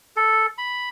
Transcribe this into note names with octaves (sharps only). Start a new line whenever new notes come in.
A4
B5